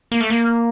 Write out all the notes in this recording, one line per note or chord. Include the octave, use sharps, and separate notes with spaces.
A#3
A3
A#3